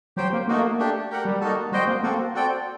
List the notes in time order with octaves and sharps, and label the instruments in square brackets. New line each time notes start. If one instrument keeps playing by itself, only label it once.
[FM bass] F#3 [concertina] G4 C5 G5
[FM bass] A#3
[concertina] A3 D#4 F#4 [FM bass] A#3
[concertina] A3 D4 G4
G4 A#4 F#5
[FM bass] G3
[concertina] A#3 D#4 F#4 A4
[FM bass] G3 [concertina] F#4 C5 D#5 G5
[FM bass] A#3
[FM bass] A#3 [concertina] C4 F#4 A4
[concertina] C4 F#4 A4 D5 G5